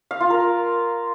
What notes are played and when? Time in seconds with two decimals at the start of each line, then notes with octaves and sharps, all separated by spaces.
0.11 F5
0.21 F4
0.30 A#4